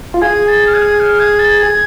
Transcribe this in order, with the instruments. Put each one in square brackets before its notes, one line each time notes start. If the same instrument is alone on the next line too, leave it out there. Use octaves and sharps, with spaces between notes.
[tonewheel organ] F4
[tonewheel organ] G#4 [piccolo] G#6
[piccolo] A6
F6
G#6
F6
G#6
A6
G#6